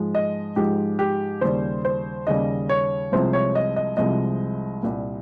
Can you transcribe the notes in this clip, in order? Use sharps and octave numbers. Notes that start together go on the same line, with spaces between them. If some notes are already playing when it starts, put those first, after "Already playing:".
Already playing: G#2 F3 G#3
D#5
G#2 F3 G#3 G4
G4
D#2 C#3 G3 C5
C5
D#2 C#3 G3 D#5
C#5
C2 C3 F3 G#3 C5
C#5
D#5
D#5
C2 C3 F3 G#3 D#5
C2 A#2 G3